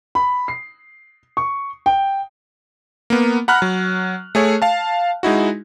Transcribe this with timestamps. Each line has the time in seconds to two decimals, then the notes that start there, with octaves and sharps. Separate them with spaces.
0.15 B5
0.48 C7
1.37 C#6
1.86 G5
3.10 A#3 B3
3.48 F#5 A#5 B5 F6 F#6
3.62 F#3
4.35 A3 G#4 C#5
4.62 F5 A5
5.23 G#3 D#4 E4 F#4